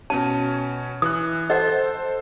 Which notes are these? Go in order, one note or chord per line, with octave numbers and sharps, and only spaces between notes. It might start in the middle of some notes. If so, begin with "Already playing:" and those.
B2 C#4 C#5 A5
E3 D#6 F#6
A4 C5 D#5 F#5